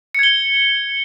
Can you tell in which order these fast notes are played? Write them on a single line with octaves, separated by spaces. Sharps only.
C#7 G#6 G7